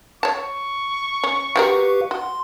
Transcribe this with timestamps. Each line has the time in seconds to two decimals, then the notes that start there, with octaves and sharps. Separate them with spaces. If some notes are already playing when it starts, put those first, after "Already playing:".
0.23 C#5 A5 C#6
1.24 C#4
1.56 G3 F#4 G4 A#4 B4 F5
2.11 F#4 C6